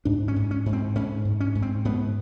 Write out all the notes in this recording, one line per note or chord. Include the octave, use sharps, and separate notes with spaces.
G#2 D4
C#4
G#2
C#4
G#2
C4
G#2 C#4
G#2
C#4
G#2
C4
G#2 B3